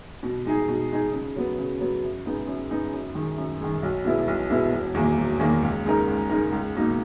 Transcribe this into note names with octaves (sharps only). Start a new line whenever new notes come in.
B2
G#3 D#4 G#4
B2
G#3 D#4 G#4
C#3
F#3 B3
C#3
F#3 B3
F#2
C#3 G#3 B3 D#4
F#2
C#3 G#3 B3 D#4
F#2
D#3 G#3
F#2
D#3 G#3
B1
B2 G#3 B3 E4
B1
B2 G#3 B3 E4
E1
E2 D#3 A#3
E1
E2 D#3 A#3
C#2
C#3 G#3 D#4 A#4
C#2
C#3 G#3 D#4 A#4
C#2
B2 A#3 D#4